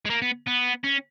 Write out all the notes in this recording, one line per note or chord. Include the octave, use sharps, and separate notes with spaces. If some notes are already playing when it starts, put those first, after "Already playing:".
G#3
A#3
B3
B3
C#4